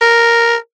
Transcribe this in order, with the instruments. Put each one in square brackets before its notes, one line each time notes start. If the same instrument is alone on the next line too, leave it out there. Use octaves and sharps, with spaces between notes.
[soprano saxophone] A#4